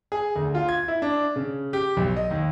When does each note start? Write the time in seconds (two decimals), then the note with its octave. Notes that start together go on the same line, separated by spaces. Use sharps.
0.12 G#4
0.36 D2
0.55 F4
0.69 G#6
0.88 E4
1.02 D4
1.36 C#3
1.73 G4
1.97 B1
2.16 D#5
2.31 D#2